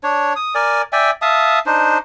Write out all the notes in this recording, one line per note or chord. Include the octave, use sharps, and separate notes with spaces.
D4 C#5
D#6
A#4 D5 G#5
D5 E5 G5 G#5
E5 F5 A5 D#6
D4 D#4 C5